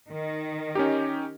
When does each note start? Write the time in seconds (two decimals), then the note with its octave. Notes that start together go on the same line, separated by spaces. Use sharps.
0.10 D#3
0.75 C#4 D#4 G4